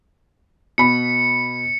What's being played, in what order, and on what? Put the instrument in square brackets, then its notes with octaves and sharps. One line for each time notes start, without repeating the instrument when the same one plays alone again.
[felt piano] B2 B5 [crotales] C#7